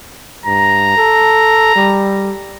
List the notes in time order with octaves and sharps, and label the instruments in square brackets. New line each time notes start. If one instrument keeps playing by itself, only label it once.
[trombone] G2 [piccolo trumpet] A#5
[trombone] A4
G3